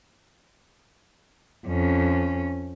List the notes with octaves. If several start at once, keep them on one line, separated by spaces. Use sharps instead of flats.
F2 C#4